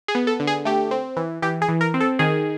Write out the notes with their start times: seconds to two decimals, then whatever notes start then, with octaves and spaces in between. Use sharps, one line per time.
0.08 G#4
0.15 B3
0.27 A4
0.40 D3
0.47 G#4
0.65 A3 G4
0.91 C4
1.17 E3
1.42 E3 G4
1.62 G#4
1.69 E3
1.81 A#4
1.94 C4
2.00 A4
2.19 D#3 G#4